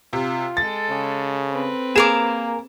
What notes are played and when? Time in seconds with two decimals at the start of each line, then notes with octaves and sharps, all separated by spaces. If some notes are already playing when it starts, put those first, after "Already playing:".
0.13 C3 F4
0.57 G#3 A4 A6
0.90 C#3
1.50 C4 B4
1.96 A#3 G#4 A#4 D6 E7